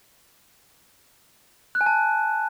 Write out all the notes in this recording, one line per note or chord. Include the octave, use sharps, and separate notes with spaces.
F#6
G#5
A5